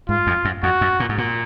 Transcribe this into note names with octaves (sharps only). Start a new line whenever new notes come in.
G#2 F4
F2
F#2
F2 F#4
F#2
A#2
G#2
A#2